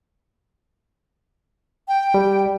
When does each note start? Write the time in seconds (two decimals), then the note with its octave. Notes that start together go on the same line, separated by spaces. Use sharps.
1.88 G5
2.14 G3